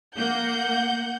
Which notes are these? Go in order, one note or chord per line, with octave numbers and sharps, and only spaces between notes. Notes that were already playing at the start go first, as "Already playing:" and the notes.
A#3 F#5 G6